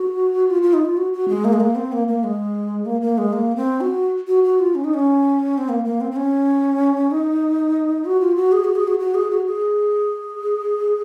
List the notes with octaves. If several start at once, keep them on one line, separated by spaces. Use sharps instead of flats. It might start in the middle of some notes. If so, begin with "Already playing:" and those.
Already playing: F#4
F4
F4
D#4
F4
F#4
F#4
G#3
A#3
G#3
A#3
C4
A#3
A#3
G#3
A#3
A#3
G#3
A#3
C4
F#4
F#4
F#4
F4
C#4
D#4
C#4
C4
A#3
A#3
C4
C4
C#4
D#4
F#4
F4
F#4
G#4
F#4
G#4
F#4
F#4
G#4
F#4
G#4